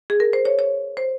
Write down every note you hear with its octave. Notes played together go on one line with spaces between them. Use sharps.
G#4
A#4
C5
C#5
C#5
C5